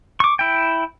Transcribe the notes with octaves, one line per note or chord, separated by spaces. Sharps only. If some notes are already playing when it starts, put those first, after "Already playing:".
C#6 D6
E4 G5